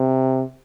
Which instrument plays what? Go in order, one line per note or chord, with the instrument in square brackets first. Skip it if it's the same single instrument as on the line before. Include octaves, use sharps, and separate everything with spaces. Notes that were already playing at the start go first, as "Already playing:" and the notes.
Already playing: [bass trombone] C3